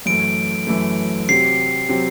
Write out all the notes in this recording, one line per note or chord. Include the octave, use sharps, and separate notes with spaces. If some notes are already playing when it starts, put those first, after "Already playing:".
F#2 E3 A3 D7
F#2 E3 A3
C3 F#3 C4 G4 C7
C3 F#3 C4 G4